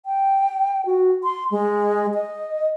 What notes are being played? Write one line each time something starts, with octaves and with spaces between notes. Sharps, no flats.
G5
F#4
C6
G#3
D#5